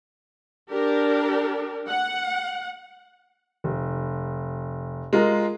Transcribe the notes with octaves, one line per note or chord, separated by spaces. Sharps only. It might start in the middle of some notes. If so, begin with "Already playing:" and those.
D4 G4 A#4
F#5
F1
G#3 F4 A#4